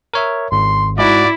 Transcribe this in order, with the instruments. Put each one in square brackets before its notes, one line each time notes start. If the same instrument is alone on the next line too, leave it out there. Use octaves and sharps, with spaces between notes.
[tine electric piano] A#4 C#5 E5
[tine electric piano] G#1 [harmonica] C6
[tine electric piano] G#2 [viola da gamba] E4 [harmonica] F#4 [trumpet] D5